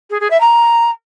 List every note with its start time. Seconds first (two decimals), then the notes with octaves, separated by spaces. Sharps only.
0.10 G#4
0.20 G#4
0.30 E5
0.40 A#5